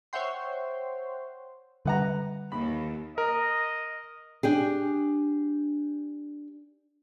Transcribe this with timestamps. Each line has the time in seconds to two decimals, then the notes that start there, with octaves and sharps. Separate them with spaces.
0.13 C5 C#5 E5 F#5 G5 C6
1.85 D3 G3 B4 F#5 A#5
2.52 D#2 B5
3.18 A#4 D#5
4.43 D4 G4 G#4